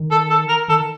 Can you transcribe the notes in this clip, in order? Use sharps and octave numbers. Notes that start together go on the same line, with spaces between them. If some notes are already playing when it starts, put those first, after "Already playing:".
Already playing: D#3
A4
A4
A#4
D#3 A4